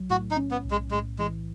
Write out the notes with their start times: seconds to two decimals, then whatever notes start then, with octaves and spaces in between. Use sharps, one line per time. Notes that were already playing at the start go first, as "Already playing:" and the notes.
Already playing: B1 F#3
0.10 A2 F#4
0.31 D#4
0.37 C#4
0.51 B3
0.65 B1
0.71 G#3
0.91 A2 G#3
1.19 E3 G#3